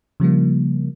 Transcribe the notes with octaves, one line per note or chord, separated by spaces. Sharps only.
C#3 F3 G3 A#3